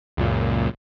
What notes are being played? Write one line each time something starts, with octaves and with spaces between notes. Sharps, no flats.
C#2 F#2 A#2